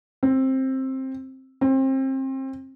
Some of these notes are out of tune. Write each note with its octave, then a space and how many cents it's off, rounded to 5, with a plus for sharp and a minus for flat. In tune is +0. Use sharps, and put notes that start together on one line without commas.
C4 +15
C4 +30